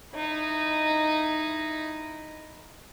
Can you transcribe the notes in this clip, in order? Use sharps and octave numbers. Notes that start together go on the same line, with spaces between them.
D#4 E4